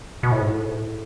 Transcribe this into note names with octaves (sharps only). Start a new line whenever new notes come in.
B2
A2
G#2
A2